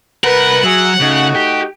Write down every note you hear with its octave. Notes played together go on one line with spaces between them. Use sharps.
C2 A#4 B4 F#5
F#3 F#4 G#4 E5
C#3 A3 D#4 F#4
G4